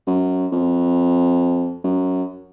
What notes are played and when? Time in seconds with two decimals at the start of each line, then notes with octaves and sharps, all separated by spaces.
0.07 F#2
0.52 F2
1.84 F#2